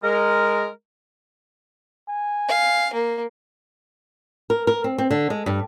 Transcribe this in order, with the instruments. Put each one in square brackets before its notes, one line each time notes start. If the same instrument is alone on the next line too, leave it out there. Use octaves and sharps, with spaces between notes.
[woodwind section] G#3 A#4
[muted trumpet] G#5
[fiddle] F5
A#3
[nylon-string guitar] A#4
A#4
C4
C4
D3
G#3
G2